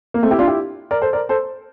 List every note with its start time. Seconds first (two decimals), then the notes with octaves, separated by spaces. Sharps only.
0.14 A#3
0.22 A3 C4
0.31 E4 G4
0.39 D4 F4
0.47 E4 G4
0.91 A#4 D5
1.02 A4 C5
1.13 A#4 D5
1.29 A4 C5